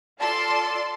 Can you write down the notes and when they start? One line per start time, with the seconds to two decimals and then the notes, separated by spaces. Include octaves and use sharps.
0.20 F4 A4 D5 A5 C6